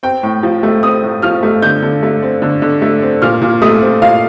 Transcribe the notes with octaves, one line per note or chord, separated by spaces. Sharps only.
C4 G5
A2
F3
A3
C4 D#6
A2
F3 F6
A3
D3 G6
D3
A3
C4
D3
D3
A3
C4
A#2 F6
A#2
A3 D#6
C4
A#2 F5